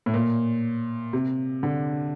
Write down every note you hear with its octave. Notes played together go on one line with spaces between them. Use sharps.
A2
A#2
C3
D3